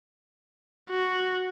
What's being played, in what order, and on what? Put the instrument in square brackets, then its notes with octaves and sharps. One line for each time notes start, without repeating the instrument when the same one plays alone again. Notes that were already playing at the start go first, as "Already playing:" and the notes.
[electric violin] F#4